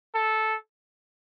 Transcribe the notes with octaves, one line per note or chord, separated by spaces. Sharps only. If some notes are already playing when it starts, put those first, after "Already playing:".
A4